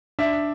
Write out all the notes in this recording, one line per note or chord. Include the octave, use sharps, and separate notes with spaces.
D4 E5